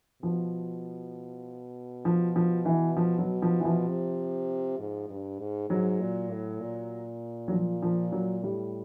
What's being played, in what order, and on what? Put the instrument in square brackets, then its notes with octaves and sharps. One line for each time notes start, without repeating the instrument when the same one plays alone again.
[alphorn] B2 [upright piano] F3
[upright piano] F3
F3
E3
F3
F#3
F3
E3
F3
[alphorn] C3
G#2
G2
G#2
[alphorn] G#2 [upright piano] F#3
[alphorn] A#2
A2
A#2
[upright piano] F#3
F3
F3
F#3
[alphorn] A2 [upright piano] G3